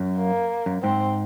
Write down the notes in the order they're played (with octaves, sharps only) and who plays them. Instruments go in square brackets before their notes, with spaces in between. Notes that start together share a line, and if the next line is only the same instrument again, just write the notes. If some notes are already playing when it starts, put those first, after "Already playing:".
Already playing: [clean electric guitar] F#2
[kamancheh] A#3
[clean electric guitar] F#2
[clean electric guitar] G#2 [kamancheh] C4